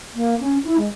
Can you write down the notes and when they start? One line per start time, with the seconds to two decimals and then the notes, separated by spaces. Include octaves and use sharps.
0.15 A#3
0.40 C#4
0.64 E4
0.77 G#3